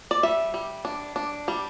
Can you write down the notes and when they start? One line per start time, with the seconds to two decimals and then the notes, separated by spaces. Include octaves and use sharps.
0.11 D5
0.23 G3 E5
0.54 G3
0.85 D4
1.16 D4
1.48 G3